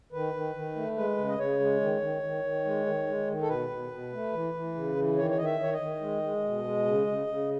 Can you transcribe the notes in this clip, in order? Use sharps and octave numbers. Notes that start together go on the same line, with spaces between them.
D#3 B4
D#3
D#3
A3
G#3 B4
C#3
D#5
C#3 C#5
G#3
D#3
D#3
D#3
D#3
G#3
D#3
G#3
D#3
A4
B2 B4
B2
B2
A3
E3
E3
C#3
E3
D#3 C#5
C#5
D#3 D#5
E5
D#3 C#5
D#5
D#3
G#3
G#3
B2
G#3
C#3
C#3
C#3